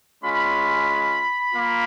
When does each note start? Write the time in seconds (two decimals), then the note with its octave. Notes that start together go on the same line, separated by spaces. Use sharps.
0.23 G#3 C#4 F4 B5
1.52 A#3 F4